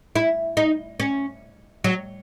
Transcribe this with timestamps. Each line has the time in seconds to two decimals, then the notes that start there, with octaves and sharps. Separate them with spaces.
0.16 E4
0.57 D#4
1.00 C#4
1.84 F#3